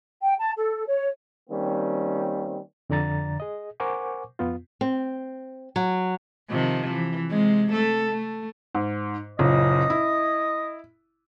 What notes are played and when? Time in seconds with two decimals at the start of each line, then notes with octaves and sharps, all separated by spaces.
0.21 G5
0.37 A5
0.56 A4
0.86 C#5
1.49 D#3 G3 A#3 C4 C#4
2.90 F2 D3 D5 A#5 A6
3.40 G#4 D#5
3.80 A#4 C5 F#5 G#5 C#6 D6
4.39 F2 B3 F4
4.81 C4
5.76 F#3
6.49 C3 D#3 F3
6.90 E3
7.30 C3 G#3
7.72 A3 A4
8.10 A3
8.75 G#2
9.39 F#1 A#2 C#3 D#5
9.90 E4